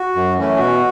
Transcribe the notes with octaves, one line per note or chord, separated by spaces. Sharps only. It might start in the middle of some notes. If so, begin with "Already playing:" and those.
Already playing: F#4
F#2
E3 A3 C#4
B2 F#4